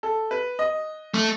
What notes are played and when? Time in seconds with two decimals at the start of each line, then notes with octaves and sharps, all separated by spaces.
0.03 A4
0.31 B4
0.59 D#5
1.14 A3